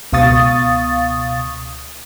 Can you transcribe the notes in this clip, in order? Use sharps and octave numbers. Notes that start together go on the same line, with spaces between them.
C#2 B2 F5 C#6 D#6 A6